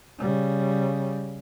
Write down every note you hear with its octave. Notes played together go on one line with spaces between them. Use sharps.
C#3 G3